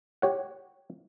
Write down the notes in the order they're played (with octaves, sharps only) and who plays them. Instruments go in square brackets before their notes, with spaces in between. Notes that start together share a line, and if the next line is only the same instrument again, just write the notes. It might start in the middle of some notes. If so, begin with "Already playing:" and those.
[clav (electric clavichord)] G4 C#5 F#5